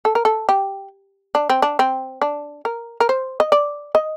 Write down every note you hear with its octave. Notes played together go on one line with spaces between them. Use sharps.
A4
A#4
A4
G4
D4
C4
D4
C4
D4
A#4
A#4
C5
D#5
D5
D#5